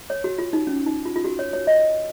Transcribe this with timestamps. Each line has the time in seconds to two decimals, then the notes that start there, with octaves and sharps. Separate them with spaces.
0.10 C#5
0.24 F#4
0.38 F4
0.53 D#4
0.67 C#4
0.86 D#4
1.05 F4
1.16 F4
1.25 F#4
1.39 C#5
1.53 C#5
1.67 D#5